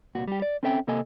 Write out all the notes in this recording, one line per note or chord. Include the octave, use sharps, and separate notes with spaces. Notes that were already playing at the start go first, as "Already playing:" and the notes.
C2 A#2 F#4
G3 G4
D5
C4 C#4 A4 E5 G5
C3 A#3 A4 D#5 G#5